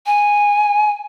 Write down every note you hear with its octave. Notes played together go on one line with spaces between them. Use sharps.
G#5